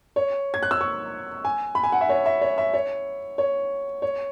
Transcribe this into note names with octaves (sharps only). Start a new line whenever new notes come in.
C#5
G#6
F#6
E6
C#6
G#5
B5
G#5
F#5
E5
C#5
E5
C#5
E5
C#5
C#5
C#5